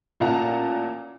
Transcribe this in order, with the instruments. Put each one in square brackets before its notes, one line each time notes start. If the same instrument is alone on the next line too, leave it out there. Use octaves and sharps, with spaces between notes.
[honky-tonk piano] A1 A#2 F5 F#5 A5 A#5